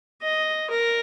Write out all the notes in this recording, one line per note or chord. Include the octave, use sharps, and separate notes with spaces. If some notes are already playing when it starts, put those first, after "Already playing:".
D#5
A#4